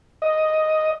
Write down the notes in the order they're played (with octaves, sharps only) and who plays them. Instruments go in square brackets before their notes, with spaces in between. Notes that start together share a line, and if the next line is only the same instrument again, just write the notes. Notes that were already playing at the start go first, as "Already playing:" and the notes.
[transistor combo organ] D#5